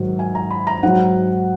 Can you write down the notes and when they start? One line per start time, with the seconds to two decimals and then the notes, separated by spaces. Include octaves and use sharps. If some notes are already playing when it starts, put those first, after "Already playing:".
Already playing: G#2 D#3 F#3
0.19 G#5
0.35 A#5
0.50 B5
0.67 A#5
0.83 G#2 F#3 F#5